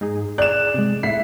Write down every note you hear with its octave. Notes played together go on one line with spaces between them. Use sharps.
G#2 D#4 G#4
G#4 D5 F#6 E7
C3 G#3
A2 E4 E5 F#5 B6 C7